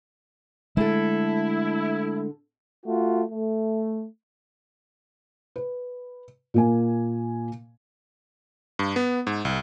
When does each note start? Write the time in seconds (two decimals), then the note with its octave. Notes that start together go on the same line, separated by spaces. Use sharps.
0.77 D3 G#3 A3 E4 A4
2.85 A3 F4 F#4
3.30 A3
5.56 B4
6.54 A#2 A#3 G#5
8.79 G2
8.96 B3
9.27 G#2
9.45 C2